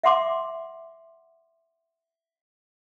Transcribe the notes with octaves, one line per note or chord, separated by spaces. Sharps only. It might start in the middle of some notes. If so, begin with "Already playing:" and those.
E5 F#5 C6 D6